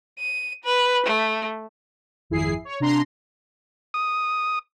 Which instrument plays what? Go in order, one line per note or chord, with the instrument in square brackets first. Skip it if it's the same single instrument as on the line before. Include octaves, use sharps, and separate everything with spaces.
[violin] D#7
B4
A3
[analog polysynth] G#1 F2 E4 G#4 C7
C#5
C3 D4 A#5 C6
[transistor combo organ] D#6